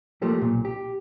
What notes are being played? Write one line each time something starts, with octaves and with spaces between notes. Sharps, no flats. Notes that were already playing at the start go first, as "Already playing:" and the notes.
F3 A3 A#3 G4
B1 A#2
G4